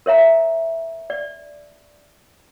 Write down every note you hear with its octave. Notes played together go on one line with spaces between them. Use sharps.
A#4 C#5 E5 A#5
D5